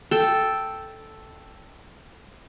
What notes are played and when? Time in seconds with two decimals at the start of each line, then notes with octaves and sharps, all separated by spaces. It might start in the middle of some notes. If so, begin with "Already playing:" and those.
0.11 A4 G5